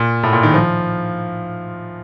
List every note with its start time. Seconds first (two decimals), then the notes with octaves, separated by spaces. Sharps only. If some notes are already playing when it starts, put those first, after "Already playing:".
Already playing: A#2
0.23 A2
0.33 A#2
0.43 D#3
0.54 F3